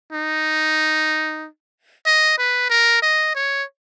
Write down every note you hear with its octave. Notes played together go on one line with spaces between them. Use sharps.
D#4
D#5
B4
A#4
D#5
C#5